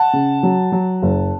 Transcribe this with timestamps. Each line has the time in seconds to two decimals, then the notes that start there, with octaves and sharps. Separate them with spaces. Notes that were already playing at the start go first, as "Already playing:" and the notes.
Already playing: F#5 A5
0.13 C#3
0.43 F#3
0.72 F#3
1.03 F#1